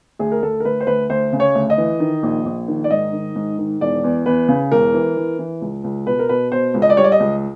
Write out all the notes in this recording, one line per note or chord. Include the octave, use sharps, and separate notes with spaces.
D2 G#4
A#4
D2 A4
A#4
D2 B4
C5
D2 B4
D2 C5
C#3
C#5
D2
D#5
E3
D#3
A#1
A#1
D#3
D5
G#2 D#5
D#3
G#2
D#3
E1 D5
E2
E2 B4
C#3
E1 A#4
E3
E3
E3
C#2
C#2
B2 B4
A#4
B2 B4
B2 C5
C#2
D#5
D5
G3 C#5
D5
D#5
C#2